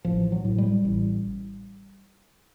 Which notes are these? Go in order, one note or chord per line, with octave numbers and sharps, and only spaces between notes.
A1 F3
F#3
A2
G3
A1